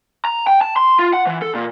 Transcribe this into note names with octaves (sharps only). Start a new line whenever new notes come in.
A#5
G5
A5
C6
F4
F#5
E3
A4
A#2